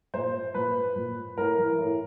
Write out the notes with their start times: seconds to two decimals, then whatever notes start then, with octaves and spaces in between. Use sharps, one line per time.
0.13 A#2 C5
0.54 A#2 B4
0.96 A#2
1.37 A2 A#4
1.58 E3
1.79 A2